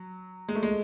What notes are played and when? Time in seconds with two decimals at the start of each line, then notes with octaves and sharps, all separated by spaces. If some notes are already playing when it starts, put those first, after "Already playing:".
Already playing: F#3
0.49 G#3
0.55 A3
0.63 G#3